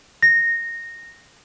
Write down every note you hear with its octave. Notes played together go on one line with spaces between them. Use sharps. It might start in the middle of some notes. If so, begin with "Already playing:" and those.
A#6